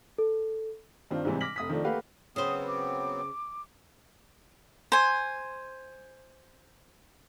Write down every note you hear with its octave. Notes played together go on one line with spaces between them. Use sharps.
A4
G2 D#3 C4 D4 F4
G#2 C3 E3 G3 C4
D6 F6 A#6 B6 F#7
F1 D#6 B6
D#3 F3 A3 D4
A3 A#3 G4 B4 F5 F#5
C#3 F#3 B3 C4 C5 D#6
D6
C5 G#5